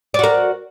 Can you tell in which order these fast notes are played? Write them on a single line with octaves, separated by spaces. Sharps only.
D5 F#4 A#4